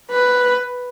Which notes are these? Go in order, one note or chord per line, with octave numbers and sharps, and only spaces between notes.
B4